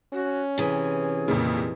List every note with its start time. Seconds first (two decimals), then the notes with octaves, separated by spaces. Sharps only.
0.13 C#4 F#4
0.58 C3 E3 G#4
1.28 F2 A#2 C#3